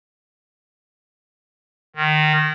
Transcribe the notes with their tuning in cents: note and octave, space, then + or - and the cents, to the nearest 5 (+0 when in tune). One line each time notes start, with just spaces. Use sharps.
D#3 -20